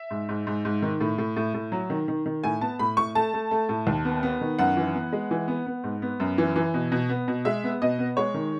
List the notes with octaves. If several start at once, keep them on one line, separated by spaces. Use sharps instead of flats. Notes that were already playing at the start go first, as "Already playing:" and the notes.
Already playing: E5
G#2
G#2
G#2
G#2
D#3
A2
A2
A2
A2
F#3
D#3
D#3
D#3
A2 G#5
B3 A5
A2 B5
A2 C#6
A3 A5
A3
A3
A2
D#2
B3
B3
D#3
F#2 F#5
E3
B3
G#3
E3
B3
B3
G#2
B3
F#2
E3
E3
B2
B2
B3
B2
G#3 E5
B3
B2 D#5
B3
G#3 C#5
D#3